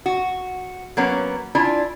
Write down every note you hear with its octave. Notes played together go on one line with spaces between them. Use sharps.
F#4
F#3 A#3 B3 C#4
D4 E4 F4 G#5